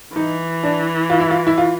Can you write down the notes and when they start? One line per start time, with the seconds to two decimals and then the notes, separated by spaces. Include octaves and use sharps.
0.16 E3 D#4
0.64 D4
1.10 F4
1.20 E4
1.31 F4
1.47 E4
1.58 F4